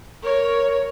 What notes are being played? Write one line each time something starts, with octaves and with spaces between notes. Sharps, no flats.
A#4 C#5